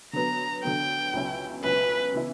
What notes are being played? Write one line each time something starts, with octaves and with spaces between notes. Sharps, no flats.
D3 F#3 B3 A#5
D3 F#3 B3 G5
C#2 B2 F#3 C#4 E4
C#2 B2 F#3 C#4 E4 B4
C#3 E3 B3 E4